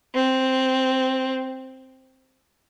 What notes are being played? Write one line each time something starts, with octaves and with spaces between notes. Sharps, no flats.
C4